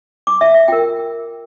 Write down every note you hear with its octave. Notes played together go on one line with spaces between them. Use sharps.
D6
E5
E5
F4 A#4 G5